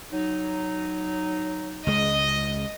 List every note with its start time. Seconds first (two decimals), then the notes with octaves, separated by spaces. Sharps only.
0.12 F#3 D#4
1.87 C#2 G#3 D#5